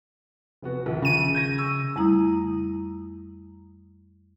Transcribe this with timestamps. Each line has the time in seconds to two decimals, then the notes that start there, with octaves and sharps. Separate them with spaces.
0.62 F1 B3 F#4
0.86 A#1 D#2
1.02 C#3 D#7
1.35 G6 G#6 A#6
1.58 C#6 E6
1.96 F2 G3 A3 E4 A#5 D#6